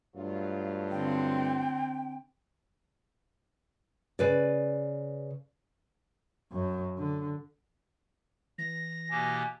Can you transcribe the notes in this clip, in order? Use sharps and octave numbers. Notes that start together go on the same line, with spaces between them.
G2 F#3 A3 F4
D3 C4 G5
C#3 B4 D5
F#2
D3
E3 A#6
B2 A#3 G4 G#5